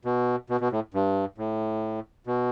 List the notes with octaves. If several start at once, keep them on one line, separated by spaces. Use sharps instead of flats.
B2
B2
B2
A2
G2
A2
B2